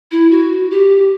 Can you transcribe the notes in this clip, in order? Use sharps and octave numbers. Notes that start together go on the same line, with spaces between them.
E4
F#4
G4